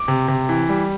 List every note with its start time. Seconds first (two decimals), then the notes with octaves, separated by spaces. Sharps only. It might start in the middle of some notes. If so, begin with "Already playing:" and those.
Already playing: D6
0.08 C3
0.28 C3
0.49 E3
0.69 G3